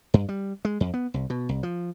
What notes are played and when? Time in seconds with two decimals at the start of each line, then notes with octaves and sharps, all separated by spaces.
0.14 G2
0.29 G3
0.65 G#3
0.80 F2
0.94 B3
1.14 C2
1.30 B2
1.49 C2
1.63 F3